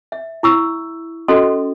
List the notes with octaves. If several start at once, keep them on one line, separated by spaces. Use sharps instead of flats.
E5
E4 C#6 E6
C#4 F#4 A4 D#5 C6